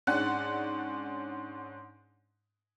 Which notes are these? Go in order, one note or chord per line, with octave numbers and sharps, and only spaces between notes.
G#2 C#4 D4 F#5 F#6